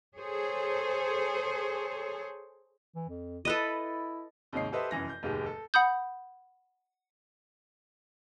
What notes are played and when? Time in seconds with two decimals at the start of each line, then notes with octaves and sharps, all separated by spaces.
0.18 G#4 A4 C5 C#5
2.96 E3
3.09 F2
3.45 E4 A4 B4 D#5
4.53 D#2 G#2 C3 C#5 D#5 C7
4.72 G4 A4 B4 C5 D#5 E5
4.91 F1 F#2 E3 A#6
5.09 G6
5.23 F1 D#2 G#2 G#3 G4
5.46 A4
5.74 F#5 B5 D#6 G6